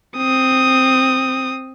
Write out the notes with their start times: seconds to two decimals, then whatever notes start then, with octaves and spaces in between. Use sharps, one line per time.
0.17 C4 D#6